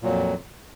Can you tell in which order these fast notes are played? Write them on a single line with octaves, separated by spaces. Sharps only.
A#2 F#3 F2